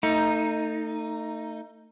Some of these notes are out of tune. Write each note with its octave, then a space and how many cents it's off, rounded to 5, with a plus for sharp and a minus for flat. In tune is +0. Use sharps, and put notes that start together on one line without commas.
A3 +30 D#4 +0